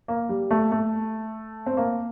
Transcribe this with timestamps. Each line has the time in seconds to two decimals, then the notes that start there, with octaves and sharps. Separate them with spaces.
0.08 A#3
0.29 G3
0.51 A3
0.72 A3
1.66 C4
1.77 A#3